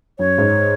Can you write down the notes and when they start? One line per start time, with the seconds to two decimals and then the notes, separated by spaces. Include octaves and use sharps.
0.19 F#2 C#5
0.38 G#2